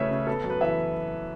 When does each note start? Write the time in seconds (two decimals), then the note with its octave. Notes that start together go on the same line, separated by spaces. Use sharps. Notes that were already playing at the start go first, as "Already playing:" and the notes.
Already playing: C#3 A3 C#4 B4 C#5 E5
0.11 C#3
0.27 B3 A4
0.44 F#2
0.50 B4
0.61 E3 E5